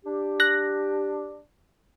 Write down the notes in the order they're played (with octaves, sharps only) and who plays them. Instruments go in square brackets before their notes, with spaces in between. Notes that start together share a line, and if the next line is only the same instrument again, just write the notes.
[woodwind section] D4 G4
[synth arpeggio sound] F#6 A#6